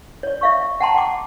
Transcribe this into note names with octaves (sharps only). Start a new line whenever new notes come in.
C#5 D5
E5 F5 C#6
F#5 G5 A5 A#5 C6
F#5 G5 D6